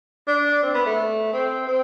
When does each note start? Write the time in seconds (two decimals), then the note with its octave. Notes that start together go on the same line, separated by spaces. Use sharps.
0.27 D4
0.63 C4
0.74 B3
0.86 A3
1.33 C4
1.67 C4